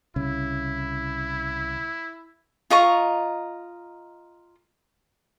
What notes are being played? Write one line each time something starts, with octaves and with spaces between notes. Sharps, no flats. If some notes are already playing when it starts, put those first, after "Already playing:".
C2 C#3 E4
F4 D#5 A#5 C#6